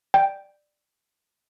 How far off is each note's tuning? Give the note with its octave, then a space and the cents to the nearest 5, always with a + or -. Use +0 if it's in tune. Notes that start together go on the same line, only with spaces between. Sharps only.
D5 +15 G5 +0